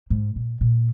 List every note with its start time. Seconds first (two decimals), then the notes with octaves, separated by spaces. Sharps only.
0.10 G#2
0.36 A#2
0.61 A#2